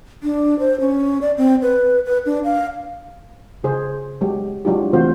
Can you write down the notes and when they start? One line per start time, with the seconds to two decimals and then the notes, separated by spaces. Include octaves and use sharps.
0.23 D4
0.59 C5
0.80 C#4
1.21 D5
1.37 C4
1.62 B4
2.06 B4
2.26 D4
2.44 F5
3.64 C#3 G#4 C5
4.21 F#3 G#3 G4
4.65 F#3 G#3 D4 E4 F4 G4
4.93 E3 A3 C4 F4 F#4 C5